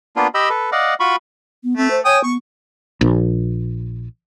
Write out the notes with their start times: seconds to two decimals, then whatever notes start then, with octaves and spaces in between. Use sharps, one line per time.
0.16 A#3 B3 D4 F4
0.34 G4 D#5 G5 B5 E6
0.50 A4 B4
0.72 D5 D#5 F5 F#5
1.00 F4 F#4 B5 C#6
1.64 B3
1.77 A3 C4
1.90 C5
2.05 C#5 G5 G#5 D#6
2.24 B3 C#6
3.01 A#1